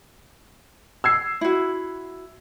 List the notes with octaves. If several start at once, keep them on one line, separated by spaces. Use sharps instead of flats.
E6 G#6 C7
E4 F#4